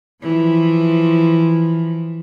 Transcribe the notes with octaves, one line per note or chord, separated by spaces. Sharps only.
E3 F3